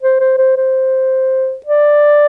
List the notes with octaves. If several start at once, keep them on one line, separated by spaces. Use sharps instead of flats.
C5
C5
C5
C5
D5